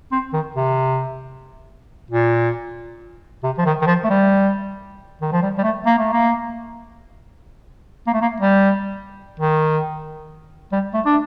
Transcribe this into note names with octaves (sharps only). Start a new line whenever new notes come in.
C4
D#3
C3
A#2
C3
F3
D#3
D#3
F3
A3
G3
D#3
F3
G3
G3
A3
A#3
A3
A#3
A#3
A3
A#3
G3
D#3
G3
A3
D4